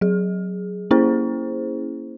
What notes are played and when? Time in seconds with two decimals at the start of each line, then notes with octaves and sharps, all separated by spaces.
0.01 F#3 G#4
0.91 A#3 C#4 E4 G#4 C5